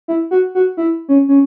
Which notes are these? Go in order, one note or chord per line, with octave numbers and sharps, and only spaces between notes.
E4
F#4
F#4
E4
C#4
C#4